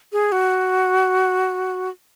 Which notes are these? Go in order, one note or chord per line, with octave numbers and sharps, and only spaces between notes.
G#4
F#4